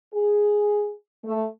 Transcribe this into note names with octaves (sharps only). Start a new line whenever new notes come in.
G#4
A3